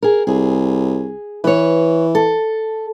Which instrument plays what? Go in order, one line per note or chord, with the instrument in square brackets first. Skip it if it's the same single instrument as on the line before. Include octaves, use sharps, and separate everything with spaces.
[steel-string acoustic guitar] G#4 A#4
[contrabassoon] C2 [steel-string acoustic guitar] G#4
[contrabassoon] E3 [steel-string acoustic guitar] B4 C#5
[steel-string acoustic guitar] A4